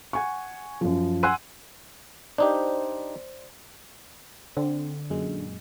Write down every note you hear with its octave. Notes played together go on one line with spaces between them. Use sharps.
F#5 G#5 C#6
F#2 F3
F#5 G#5 C6 E6 F#6 D#7
D4 D#4 G4 C5 D5
D3 C4
F#2 A#2 G#3